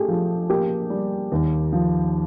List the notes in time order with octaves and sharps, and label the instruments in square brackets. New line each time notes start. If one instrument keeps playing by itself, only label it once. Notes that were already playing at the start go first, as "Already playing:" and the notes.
Already playing: [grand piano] A3 [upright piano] G4 G#4
[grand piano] F3
[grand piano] A#3 [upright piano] G4
[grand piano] G3
D#2
F3